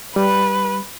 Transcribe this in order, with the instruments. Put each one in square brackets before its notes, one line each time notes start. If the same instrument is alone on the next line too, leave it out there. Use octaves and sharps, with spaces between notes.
[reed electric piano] G3 [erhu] B4